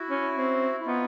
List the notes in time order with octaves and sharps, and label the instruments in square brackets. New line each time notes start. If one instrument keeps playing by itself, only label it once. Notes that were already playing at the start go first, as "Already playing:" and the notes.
Already playing: [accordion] E4 F#4
[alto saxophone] C#4
C4
[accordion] E4
[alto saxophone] B3 [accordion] D#4 F4